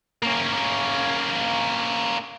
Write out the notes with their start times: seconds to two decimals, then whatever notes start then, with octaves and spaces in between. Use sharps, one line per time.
0.22 A#3 C#4